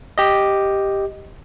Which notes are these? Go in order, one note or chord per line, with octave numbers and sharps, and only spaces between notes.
G4 D#5